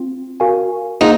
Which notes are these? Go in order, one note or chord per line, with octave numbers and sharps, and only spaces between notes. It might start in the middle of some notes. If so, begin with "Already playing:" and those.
Already playing: C4 F4
F#4 A#4 F5 G#5
A#3 D#4 F4 G#4 C5 F#5